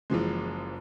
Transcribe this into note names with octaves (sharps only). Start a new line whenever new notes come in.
F#1 E3 F3 G#3